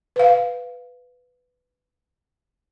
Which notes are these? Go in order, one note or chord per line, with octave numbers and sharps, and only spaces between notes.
B4 F5